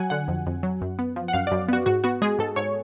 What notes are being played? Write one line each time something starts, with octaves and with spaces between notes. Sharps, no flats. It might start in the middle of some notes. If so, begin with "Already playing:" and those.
Already playing: F#3 F#5 G#5
D3 F#5
F2
F2
F#3
F#2
B3
F3
F#5
F#2 F5
D5
F#2
B3 F#4
G#2 F#4
B3 F#4
G#3 G#4
G#2 A4
G#2 C#5